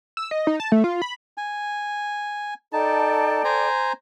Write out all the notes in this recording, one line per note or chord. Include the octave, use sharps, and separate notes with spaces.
E6
D#5
D#4
A5
A3
F4
B5
G#5
D#4 A4 D5 G5 A5
C5 G#5 A#5